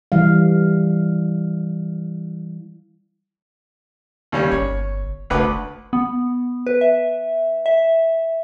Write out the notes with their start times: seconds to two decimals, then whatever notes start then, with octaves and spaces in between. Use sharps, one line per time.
0.12 E3 G3 F5
4.32 D#2 G3 C#4
4.51 G1 C#5
5.30 F#1 D2 B4 D6
5.93 B3
6.67 B4
6.81 E5
7.66 E5